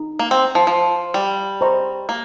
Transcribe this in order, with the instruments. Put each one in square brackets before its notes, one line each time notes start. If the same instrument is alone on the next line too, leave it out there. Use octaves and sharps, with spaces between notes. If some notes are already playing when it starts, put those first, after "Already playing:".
Already playing: [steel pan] D#4
[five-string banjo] A#3
C4
F3
F3
G3
[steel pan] C5 D#5 A#5 C#6
[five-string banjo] A#3